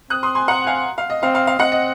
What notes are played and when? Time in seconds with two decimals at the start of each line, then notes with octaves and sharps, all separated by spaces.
0.10 C4 D#6 F#6
0.23 C6 D#6
0.35 G#5 C6
0.48 F#5 A#5
0.66 F5 G#5
0.98 F5
1.10 D#5
1.23 C4 F5
1.35 F5
1.47 F5
1.59 C4 D#5 F#5
1.72 D#5